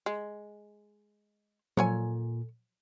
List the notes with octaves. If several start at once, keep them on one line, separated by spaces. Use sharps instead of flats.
G#3
A#2 F3 F#3 A4 C#5 G#5